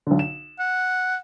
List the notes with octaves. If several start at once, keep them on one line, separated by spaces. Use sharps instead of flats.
B1 D3
E7
F#5